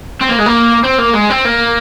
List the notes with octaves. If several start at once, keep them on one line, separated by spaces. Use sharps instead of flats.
C4
A#3
G#3
A#3
C4
A#3
G#3
C4
A#3